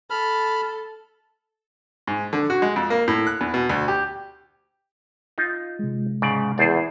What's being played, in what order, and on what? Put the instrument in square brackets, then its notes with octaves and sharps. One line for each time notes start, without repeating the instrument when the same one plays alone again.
[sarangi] A4 [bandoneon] B5 F6
[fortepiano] G#2
D3
F#4
G#3
F2
A#3
A2
F#6
E2
B2
D2
G4
[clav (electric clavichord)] D#4 F4
[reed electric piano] C3 G#3
[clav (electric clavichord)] G#2 C#3 D5
[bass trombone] E2 [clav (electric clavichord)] G#4 C5 D5